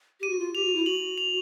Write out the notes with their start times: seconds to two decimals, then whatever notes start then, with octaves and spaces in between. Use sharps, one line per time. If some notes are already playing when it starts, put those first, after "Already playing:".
0.20 G4 D#7
0.29 F#4
0.39 F4
0.55 G4 F7
0.64 F#4
0.75 E4
0.85 F#4 F#7
1.18 F7